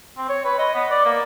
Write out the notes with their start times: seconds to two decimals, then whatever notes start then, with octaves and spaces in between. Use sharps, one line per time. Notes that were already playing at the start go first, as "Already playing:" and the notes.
0.17 C4
0.29 C#5
0.45 B4
0.59 D#5
0.75 B3
0.91 D5
1.05 A#3